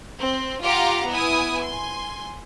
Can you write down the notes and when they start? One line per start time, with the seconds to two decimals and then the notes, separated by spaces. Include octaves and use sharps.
0.20 C4
0.64 F4 G4 F#5 A#5 D6
1.09 B3 E4 G#5 D#6
1.65 G#5 C6